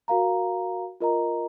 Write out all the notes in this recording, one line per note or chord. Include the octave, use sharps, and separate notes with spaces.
F#4 A#4 F5 A#5
F4 A#4 D#5 A#5